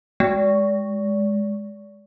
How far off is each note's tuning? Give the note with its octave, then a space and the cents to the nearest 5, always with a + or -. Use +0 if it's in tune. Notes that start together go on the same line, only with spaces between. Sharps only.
G#3 -5